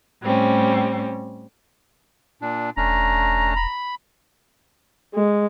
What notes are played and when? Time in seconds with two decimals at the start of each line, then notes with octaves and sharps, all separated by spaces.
0.22 A2 G3 C4 C#4
2.42 A#2 D4
2.77 E1 A3 C#4 D4 A#5
3.56 B5
5.14 G#3